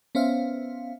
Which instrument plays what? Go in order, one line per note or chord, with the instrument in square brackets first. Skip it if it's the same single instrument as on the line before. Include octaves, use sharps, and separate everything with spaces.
[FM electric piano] B3 C#4 C5 E5 F5